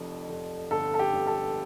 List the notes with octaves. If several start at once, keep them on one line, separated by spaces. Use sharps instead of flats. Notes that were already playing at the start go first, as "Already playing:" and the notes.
Already playing: F1 F2 F3
F1
G1 A4
A4
G4
G2
A4